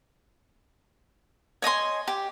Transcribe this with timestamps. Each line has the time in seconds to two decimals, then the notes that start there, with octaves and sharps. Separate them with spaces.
1.62 C#5 D#5 G#5 C6
2.08 G4